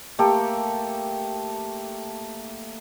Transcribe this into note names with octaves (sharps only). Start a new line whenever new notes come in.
A3 A#3 G4 A4